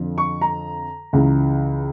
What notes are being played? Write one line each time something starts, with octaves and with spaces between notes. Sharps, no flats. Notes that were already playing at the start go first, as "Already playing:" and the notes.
Already playing: F2 D3 F3
C#6
A#5
C#2 C#3 E3